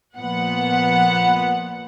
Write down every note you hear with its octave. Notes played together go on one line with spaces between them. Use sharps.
A#2 F3 B3 F#5